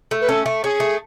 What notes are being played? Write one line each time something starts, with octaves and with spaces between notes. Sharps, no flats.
A3
B4
C#4 A4
A3
C#4 G#4
A3